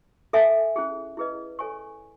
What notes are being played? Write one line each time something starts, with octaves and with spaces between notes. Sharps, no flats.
A4 E5 G#5
C#4 E4 G#4
E4 G#4 B4 D#5
A4 C#5 G#5 C#6